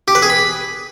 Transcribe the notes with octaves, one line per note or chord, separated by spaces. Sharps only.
G4
B4
G#4
B5